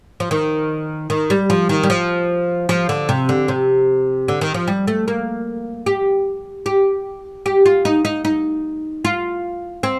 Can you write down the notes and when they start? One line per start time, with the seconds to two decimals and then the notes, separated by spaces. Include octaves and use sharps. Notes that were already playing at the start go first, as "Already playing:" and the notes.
0.20 F3
0.31 D#3
1.10 D#3
1.30 G3
1.50 F3
1.69 D#3
1.83 G3
1.90 F3
2.69 F3
2.89 D3
3.09 C3
3.29 D3
3.48 C3
4.28 D3
4.41 D#3
4.54 F3
4.68 G3
4.87 A3
5.08 A#3
5.86 G4
6.66 G4
7.46 G4
7.66 F4
7.85 D#4
8.05 D#4
8.25 D#4
9.05 F4
9.83 C4